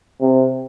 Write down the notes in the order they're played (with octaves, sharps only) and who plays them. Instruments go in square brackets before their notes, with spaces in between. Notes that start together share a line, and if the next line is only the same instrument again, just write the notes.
[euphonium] C3